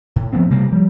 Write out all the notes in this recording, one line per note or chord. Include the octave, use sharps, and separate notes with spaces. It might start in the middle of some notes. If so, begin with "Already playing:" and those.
A2
F3 A3 B3 C4
C3 G3 A#3
F3 G3